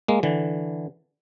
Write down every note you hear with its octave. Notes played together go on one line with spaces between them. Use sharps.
G#3 A#3
D3 E3